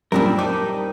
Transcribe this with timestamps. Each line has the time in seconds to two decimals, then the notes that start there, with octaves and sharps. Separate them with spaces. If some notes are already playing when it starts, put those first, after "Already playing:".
0.12 F#2 A#2 G3 C4 D4 G4 A#4
0.38 G3 C4 D#4 D6